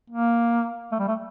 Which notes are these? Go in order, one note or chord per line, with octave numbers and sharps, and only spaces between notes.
A#3
A3
G3
A3